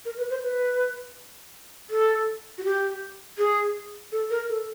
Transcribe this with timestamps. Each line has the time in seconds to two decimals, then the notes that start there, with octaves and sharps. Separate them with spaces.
0.05 A#4
0.18 B4
0.30 C5
0.43 B4
1.90 A4
2.58 F#4
2.64 G4
3.38 G#4
4.12 A4
4.30 A#4
4.49 A4